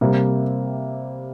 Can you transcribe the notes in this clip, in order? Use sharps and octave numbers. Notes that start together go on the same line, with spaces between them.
C3 G3 A#3